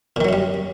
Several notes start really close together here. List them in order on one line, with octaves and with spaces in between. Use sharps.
A#2 D#3 F#3 F#2 G3